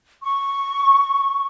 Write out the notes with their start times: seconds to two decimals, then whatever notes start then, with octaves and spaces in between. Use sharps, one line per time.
0.23 C#6